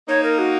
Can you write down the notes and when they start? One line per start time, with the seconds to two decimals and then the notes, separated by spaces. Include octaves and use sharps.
0.08 A#3 D#4 C#5
0.23 A#4
0.39 F#4